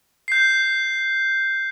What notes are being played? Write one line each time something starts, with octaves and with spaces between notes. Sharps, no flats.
G6 C7